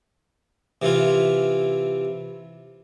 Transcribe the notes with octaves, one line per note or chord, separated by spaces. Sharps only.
C3 E3 E4 F4